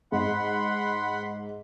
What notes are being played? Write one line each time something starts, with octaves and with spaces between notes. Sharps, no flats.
G#2 F#5 B5 C6